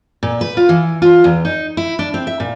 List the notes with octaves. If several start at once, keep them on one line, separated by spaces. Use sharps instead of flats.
A#2
B4
F4
E3
F4
E2
D#4
E4
D4
C4
E5
A#2